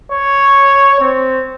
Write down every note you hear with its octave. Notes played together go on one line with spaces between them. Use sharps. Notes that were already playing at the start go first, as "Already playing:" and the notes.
C#5
C4